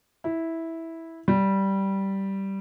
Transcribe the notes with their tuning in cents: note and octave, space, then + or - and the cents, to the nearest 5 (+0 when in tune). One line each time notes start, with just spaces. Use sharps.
E4 -10
G3 -10